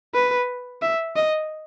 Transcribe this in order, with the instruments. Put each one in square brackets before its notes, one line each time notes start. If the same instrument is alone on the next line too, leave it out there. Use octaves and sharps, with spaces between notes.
[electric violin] B4
E5
D#5